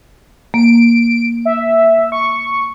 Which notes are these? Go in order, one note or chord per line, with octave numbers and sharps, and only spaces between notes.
A#3 D7
E5
C#6